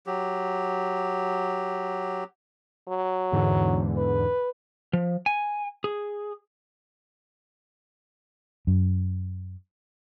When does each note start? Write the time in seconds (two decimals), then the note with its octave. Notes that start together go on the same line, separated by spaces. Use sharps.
0.06 F#3 G4
2.89 F#3
3.32 E2 G#2 D3
3.97 B4
4.93 F3
5.26 G#5
5.84 G#4
8.67 F#2